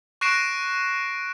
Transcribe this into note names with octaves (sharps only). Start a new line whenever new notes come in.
C#6 F#6 A#6 C7 D7 E7